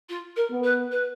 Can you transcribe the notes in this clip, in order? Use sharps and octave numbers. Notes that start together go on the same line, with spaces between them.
F4
A#4
B3
B4
B4